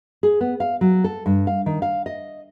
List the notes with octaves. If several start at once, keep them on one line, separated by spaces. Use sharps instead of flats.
G#4
B3
F5
F#3
A4
G2
F5
D#3
F5
D#5